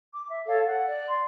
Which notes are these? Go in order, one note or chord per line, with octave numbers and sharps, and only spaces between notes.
D6
E5
A4 C#5 F5
F#5
D5
C6